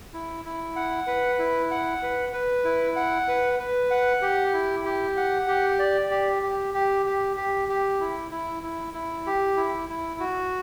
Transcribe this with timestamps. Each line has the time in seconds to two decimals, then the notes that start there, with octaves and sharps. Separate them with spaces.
0.14 E4
0.45 E4
0.76 F#5
1.07 B4
1.39 E4
1.71 F#5
2.03 B4
2.33 B4
2.65 E4
2.96 F#5
3.28 B4
3.59 B4
3.91 F#5
4.22 G4
4.54 E4
4.85 G4
5.17 F#5
5.48 G4
5.79 D5
6.11 G4
6.43 G4
6.74 G4
7.06 G4
7.36 G4
7.69 G4
8.01 E4
8.31 E4
8.63 E4
8.94 E4
9.26 G4
9.57 E4
9.89 E4
10.20 F#4